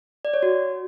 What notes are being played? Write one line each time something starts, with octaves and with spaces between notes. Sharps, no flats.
D5
C#5
F#4